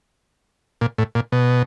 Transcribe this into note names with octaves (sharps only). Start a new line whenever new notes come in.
A#2
A2
A#2
B2